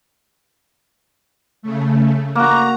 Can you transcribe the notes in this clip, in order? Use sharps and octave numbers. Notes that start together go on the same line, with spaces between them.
C#3 A3
A#3 F#4 A#5